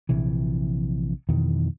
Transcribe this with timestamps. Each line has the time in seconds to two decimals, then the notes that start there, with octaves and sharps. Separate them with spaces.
0.09 A#1 C3 E3
1.29 F2 B2 D#3 E3